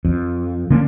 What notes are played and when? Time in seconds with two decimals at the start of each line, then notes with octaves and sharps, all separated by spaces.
0.05 F2
0.70 D3 A#3 C#4 D4